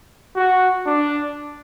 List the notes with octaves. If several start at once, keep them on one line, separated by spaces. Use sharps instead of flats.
F#4
D4